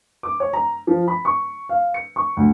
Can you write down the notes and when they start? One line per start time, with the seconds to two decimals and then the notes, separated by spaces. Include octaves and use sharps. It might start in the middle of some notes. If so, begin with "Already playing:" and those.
0.23 D6
0.40 C#5
0.53 A#5
0.87 F3
1.08 B5
1.25 C#6
1.69 F5
1.94 C#7
2.16 C#6
2.37 D2